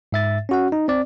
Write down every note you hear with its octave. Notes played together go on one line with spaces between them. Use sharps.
G#2 E5 A6
C#4 F#4 F#5
D#4
C4 D5